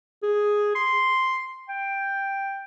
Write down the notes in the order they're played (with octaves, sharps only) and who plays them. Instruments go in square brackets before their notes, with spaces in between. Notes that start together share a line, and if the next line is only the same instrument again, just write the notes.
[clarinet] G#4
C6
G5